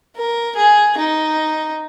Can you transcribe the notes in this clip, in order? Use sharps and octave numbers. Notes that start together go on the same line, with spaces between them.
A#4
G#4
D#4